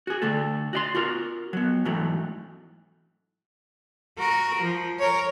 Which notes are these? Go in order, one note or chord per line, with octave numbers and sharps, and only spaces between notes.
F#4 G#4
D3 A3 A4
F#4 D5 C6
F4 F#4 A#4
F#3 B3
G#2 E3 F#3 A3
F#4 A#4
F3
A#4 C#5